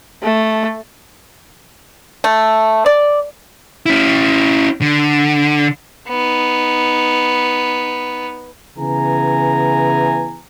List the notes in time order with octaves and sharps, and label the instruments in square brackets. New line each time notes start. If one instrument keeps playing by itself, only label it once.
[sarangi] A3
[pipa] A3
D5
[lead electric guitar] C#4 E4
D3
[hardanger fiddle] B3 D#4
[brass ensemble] C#3 E3 B3 G#4 G#5 A#5